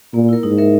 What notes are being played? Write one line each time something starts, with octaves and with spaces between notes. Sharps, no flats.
A#2 A#3
E4 A#4
G#2 D#4
A#4 E5